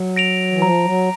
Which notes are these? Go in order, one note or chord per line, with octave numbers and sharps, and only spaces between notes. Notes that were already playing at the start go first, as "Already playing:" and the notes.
Already playing: F#3
A#6 D7 F7
E3
F3 A#5
F#3